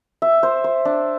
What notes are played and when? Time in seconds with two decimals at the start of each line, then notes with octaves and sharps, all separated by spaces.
0.22 E5
0.43 C5
0.64 C5
0.85 D4